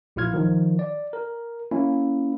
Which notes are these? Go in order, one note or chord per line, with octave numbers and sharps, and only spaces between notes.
A#1 A#2 E4 F4 F6 G#6
D#3 F3
D5
A#4
A#3 C#4 E4